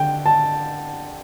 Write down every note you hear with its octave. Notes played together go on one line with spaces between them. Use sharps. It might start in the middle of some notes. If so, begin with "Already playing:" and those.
Already playing: D3 G5
A5